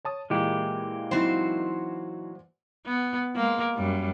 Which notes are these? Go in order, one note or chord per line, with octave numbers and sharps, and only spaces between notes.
C#5 A5 D#6
A#2 E3 G#3 A#3 G4
F#3 C4 D#4 E4 F#4 C5
B3
G#3 A#3
F#2 G3